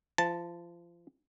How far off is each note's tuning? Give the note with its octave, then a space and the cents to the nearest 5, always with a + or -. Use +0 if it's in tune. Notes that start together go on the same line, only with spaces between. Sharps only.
F3 -30 A5 +0